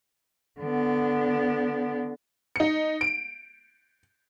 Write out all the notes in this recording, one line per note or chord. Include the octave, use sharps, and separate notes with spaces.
D3 B3
D#4 C#7
D7